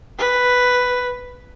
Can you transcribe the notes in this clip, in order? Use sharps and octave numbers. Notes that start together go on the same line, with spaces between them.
B4